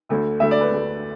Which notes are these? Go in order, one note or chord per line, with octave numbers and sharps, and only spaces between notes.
D2 D3 A3
D2 D3 A3 E5
D5
B4
D2 D3 A3